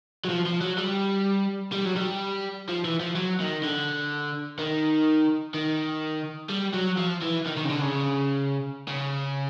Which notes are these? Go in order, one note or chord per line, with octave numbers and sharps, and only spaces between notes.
F#3
F3
F3
F#3
G3
G3
F#3
G3
F3
E3
F3
F#3
D#3
D3
D#3
D#3
G3
F#3
F3
E3
D#3
D#3
C#3
D3
C#3
C#3